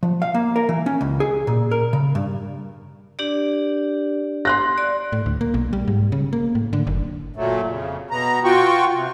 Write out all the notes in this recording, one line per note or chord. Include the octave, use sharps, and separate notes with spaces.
F3
F5
A#3
A#4
E3
C#4
C#2
G#4
A#2
A#4
C#3
G2
D4 G4 D5
C6 F#6 A#6
D5
A2
D2
A#3
B1
G3
G#2
C#3
A#3
A2
D3
F#1
A#2 F#3 A3
F2 C#3
B2 B3 A#5
F4 F#4 G5 C#6
C3